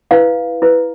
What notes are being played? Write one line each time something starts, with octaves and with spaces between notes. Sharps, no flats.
E4 B4 F5
E4 B4